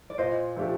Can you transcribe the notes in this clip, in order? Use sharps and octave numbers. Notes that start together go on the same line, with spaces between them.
D5
A#2 C5 D#5
F3 A3 D4 G4